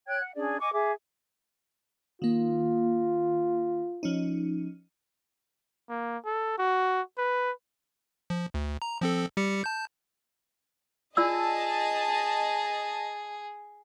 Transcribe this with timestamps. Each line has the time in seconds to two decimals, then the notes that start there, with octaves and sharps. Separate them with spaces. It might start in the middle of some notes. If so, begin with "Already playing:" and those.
0.07 C#5 G5 F#6 G#6
0.21 F#5
0.36 C#4 D4 G#4 D5
0.60 D#5 G#5 C#6 D6
0.73 G#4 E5 D6
2.22 D#3 A#3 F4
4.03 F3 C#4 D#4
5.89 A#3
6.25 A4
6.58 F#4
7.18 B4
8.30 F3
8.54 D2
8.82 A#5
9.01 F3 C4 A4
9.37 G3 G4 C#7
9.64 A5 G6
11.17 F4 G#4 D5 D#5 A5 E6